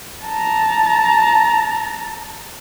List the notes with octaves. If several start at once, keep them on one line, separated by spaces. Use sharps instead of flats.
A5 A#5